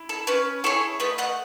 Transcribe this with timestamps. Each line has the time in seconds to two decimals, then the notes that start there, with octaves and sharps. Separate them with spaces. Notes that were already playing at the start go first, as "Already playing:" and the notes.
Already playing: E4
0.09 A4
0.27 C#4 B4
0.64 E4 G#4 A4 C#5
1.00 A3 B4 D#5
1.18 D#5 F#5